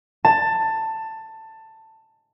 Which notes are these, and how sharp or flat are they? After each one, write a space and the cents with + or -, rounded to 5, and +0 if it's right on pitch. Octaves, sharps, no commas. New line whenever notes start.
A5 +15